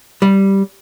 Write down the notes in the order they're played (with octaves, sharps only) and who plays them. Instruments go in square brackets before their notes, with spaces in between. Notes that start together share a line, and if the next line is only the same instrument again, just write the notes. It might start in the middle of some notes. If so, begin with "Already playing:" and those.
[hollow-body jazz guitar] G3